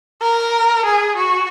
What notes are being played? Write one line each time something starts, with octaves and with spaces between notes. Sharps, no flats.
A#4
G#4
F#4